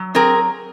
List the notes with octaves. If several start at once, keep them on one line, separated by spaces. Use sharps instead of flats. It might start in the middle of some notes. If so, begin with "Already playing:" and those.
Already playing: F#3
C4 G#4 A#4